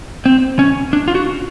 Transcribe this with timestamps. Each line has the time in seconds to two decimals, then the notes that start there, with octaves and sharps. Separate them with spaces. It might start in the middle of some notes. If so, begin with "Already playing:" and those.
0.26 C4
0.59 C#4
0.93 D4
1.08 F4
1.15 F#4